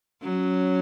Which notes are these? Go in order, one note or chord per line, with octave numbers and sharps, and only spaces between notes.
F#3 C#4